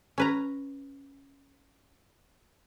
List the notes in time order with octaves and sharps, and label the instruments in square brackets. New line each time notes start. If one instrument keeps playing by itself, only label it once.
[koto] C#4 B4 A#5